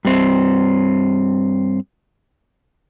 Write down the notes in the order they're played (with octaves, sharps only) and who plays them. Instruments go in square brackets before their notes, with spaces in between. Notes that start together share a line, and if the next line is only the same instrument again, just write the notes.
[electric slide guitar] G2 C4